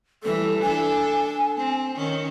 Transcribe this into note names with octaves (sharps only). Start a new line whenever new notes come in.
E3 G3 A4
D4 A4 G#5
C4
D#3 C#4